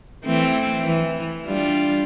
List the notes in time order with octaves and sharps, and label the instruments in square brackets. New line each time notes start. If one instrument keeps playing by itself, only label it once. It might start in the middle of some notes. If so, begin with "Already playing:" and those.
[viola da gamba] E3 A3 C4
E3
G3 D4 F4